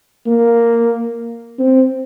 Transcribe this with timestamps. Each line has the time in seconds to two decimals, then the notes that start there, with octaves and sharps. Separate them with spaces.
0.26 A#3
1.59 C4